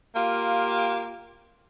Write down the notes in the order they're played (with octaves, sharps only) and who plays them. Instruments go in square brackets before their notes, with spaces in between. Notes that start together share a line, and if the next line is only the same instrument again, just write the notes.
[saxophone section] A#3 F4 G4